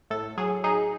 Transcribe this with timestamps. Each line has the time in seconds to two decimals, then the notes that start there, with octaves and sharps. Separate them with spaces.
0.10 A2 A4
0.37 F#3 G#4
0.64 D#4 G#4